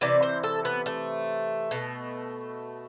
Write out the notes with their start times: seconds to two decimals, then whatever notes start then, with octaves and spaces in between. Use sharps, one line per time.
0.01 C3 E3 D5
0.22 C5
0.44 A4
0.65 B3
0.86 A3
1.71 B2 A3